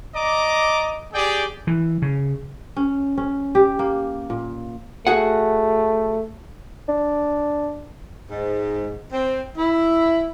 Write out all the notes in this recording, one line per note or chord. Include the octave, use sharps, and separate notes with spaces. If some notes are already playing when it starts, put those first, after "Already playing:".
D5 D#5 A#5 D6
G4 G#4 D5 G5
E3
C#3
C#4
C#4
G4
A#3
A#2
A3 F#4 G#4 F#5
D4
G#2
C4
E4